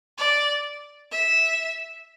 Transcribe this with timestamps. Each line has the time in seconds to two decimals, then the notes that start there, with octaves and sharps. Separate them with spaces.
0.18 D5
1.12 E5